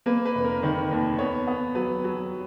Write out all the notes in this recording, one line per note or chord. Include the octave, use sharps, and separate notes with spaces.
A#3 B4
B4
F1
A#4
D#3 B4
D#2
B3 C#5
B3
F#3 B4
F#3